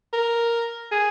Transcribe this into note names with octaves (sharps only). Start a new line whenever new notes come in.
A#4
G#4